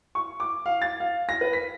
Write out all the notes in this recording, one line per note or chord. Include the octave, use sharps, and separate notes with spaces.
C#6
D6
F5
A6
F5
A#6
B4
B6